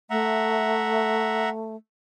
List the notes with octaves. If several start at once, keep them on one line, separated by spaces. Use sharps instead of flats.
A3 E5 F#5 A#5